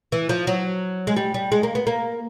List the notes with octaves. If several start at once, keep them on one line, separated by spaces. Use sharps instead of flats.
E3
F3
F#3
G#3
G3
G3
G#3
A#3
B3
A#3